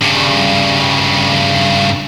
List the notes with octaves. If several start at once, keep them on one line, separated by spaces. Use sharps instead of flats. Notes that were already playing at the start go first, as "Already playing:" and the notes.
G2 C#3